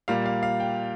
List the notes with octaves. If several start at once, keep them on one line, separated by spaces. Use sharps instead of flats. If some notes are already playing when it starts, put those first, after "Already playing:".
A#2 G3 A#3 F5
F5
F5
G5